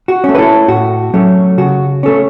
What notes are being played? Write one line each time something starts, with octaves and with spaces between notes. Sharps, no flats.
F#4
A3 C#4
B4
E4 A4
A2 F#4
F#3 A3 C#4
C#3 F#4
A3 C#4 A4